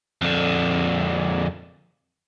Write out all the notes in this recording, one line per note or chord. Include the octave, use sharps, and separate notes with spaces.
F2 D3